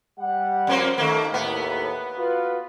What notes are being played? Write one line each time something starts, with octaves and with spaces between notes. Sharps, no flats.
G3 F#5
F2 A#3 C4
D#3 A3 A#3 A4
D#2 A2 B3
F4 F#4 B4